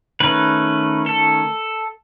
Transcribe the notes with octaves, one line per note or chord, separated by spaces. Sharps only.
D#3 A3 C#4 B4
A4